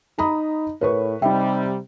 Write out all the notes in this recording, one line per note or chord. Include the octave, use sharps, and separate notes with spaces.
D#4 A#5 B5 D#6
A2 A#4 B4 C#5 C#6
C3 G3 D#4 E5 G5 B5